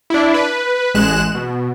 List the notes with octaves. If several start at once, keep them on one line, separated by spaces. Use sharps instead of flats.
D4 E4
B4
A1 G#3 F#6 E7
B2